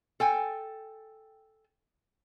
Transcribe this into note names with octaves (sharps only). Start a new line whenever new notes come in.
A4 G5 G#5